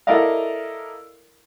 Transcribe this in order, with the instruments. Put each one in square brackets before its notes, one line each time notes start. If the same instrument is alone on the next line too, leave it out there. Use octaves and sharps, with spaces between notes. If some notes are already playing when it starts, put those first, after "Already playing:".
[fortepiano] E4 A4 A#4 D5 D#5 F5